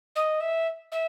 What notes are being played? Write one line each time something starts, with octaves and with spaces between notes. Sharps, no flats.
D#5
E5
E5